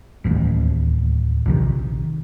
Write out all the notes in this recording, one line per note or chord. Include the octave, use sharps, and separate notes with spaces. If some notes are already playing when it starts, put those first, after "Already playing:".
D1 A1 D#2
A#1 C3 D#3